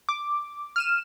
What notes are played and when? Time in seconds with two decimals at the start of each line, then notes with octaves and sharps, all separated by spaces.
0.09 D6
0.76 F6 D#7 E7